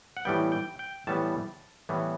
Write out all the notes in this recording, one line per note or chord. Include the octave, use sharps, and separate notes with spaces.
F#5
A2 E3 G3 B3 G5
G5
G5
A2 E3 G3 B3 A5
A2 E3 G3 B3